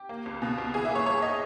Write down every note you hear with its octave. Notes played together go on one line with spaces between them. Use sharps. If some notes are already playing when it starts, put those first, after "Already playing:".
Already playing: G4
A#3
C#2
B2
C#2
E3 G#4
E5
A#3 C#5
G2 C#5
D#5